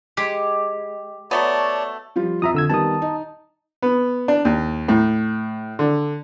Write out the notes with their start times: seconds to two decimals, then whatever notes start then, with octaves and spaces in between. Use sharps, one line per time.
0.17 G#3 G4
1.31 F#3 A3 B3 C#5 D5 A5
2.16 F3 G3 F4
2.42 F2 F3 F4 E5 A#5 D#6
2.55 D3 E6 G#6
2.70 D#3 G3 B3 A5 D#6
3.02 D#4
3.82 B3
4.28 D4
4.45 D#2
4.88 A2
5.79 D3